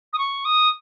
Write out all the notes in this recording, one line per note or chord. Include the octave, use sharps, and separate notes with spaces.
D#6
C#6
D#6